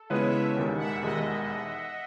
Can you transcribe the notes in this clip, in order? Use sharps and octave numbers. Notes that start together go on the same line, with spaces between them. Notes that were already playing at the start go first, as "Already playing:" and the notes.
Already playing: A4
C#3 G#3 B3 E4 B4 C#5
E5
E1 D#2 D#3 G#3 E5
F#5
E5
E1 D#2 D#3 G#3 D#5